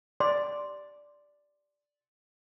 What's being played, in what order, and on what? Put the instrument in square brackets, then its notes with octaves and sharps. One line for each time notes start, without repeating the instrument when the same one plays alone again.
[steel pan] D5 [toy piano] C6